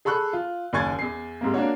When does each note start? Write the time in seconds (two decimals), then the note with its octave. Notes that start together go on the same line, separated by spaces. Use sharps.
0.05 G#4 A4 B5 C#6 F#6
0.33 F4
0.73 F#1 D#2 G#5 C#6 G#6 A6
0.99 E2 C7
1.41 G#2 C3 A#3
1.54 A#3 D4 F#4 C#5